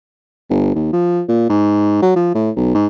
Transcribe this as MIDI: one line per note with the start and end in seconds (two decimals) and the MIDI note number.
0.50 0.73 31
0.75 0.92 39
0.93 1.21 53
1.28 1.48 46
1.50 1.98 44
2.02 2.13 54
2.16 2.30 53
2.35 2.51 45
2.56 2.70 35
2.75 2.87 44